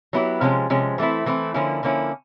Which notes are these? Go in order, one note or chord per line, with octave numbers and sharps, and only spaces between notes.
F#3 B3 E4 G4
C3 F3 G#3 C#4
C3 F3 G#3 C#4
E3 A3 C4 E4
E3 A3 C4 E4
D3 F3 A#3 C#4 E4
D3 F3 A#3 C#4 E4